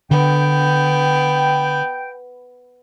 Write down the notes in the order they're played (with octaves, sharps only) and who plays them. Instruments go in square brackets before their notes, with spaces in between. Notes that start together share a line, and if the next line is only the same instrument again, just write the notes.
[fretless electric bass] D3 [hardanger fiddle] B3 [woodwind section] G5